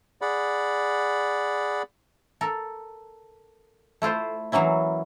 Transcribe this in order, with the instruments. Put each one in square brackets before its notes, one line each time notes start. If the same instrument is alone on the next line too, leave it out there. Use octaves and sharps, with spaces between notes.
[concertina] G#4 D5 F#5 B5
[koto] A4 A#4
A3 E4 F4 C5
E3 F#3 A#3 C#4 E4